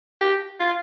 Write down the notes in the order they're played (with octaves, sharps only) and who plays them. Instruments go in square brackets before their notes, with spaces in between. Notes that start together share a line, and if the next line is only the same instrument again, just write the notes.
[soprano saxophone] G4
F4